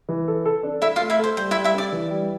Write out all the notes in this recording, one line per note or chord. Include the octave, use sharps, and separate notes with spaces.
E3
A4
A4
D4
E4 A4 E5
F4 F5
A3
E4 E5
A4 C5
G3 C5
E4 E5
G3
E4 E5
D4 D5
E3
G3